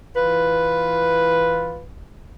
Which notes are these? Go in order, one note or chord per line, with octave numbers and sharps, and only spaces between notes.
E3 F4 B4